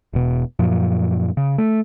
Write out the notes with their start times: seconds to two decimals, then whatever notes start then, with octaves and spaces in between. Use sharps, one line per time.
0.13 E1 B2
0.59 F#2 A#2 F3
1.37 C#3
1.58 A3